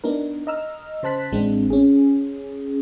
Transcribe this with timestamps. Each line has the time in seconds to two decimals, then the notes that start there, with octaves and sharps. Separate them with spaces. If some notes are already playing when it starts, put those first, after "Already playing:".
0.04 B3 D4 D#4 A#4
0.47 D#5 A#5 E6 F6
1.03 C#3 C5 A5 F#6 B6
1.32 A1 G#3 C4 D4
1.70 C#4 G#4